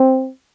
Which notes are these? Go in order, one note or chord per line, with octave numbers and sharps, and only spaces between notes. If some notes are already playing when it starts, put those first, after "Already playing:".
Already playing: C4